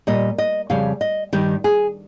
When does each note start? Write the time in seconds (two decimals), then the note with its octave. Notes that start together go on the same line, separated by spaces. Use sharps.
0.07 A#2 G3 D#5
0.38 D#5
0.70 F2 C#3 G3 F5
1.01 D#5
1.33 G2 D#3 G3 G4
1.64 G#4